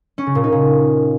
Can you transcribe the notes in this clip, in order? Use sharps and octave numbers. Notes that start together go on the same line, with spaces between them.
C#4
C#3
A#2
D#4
A#2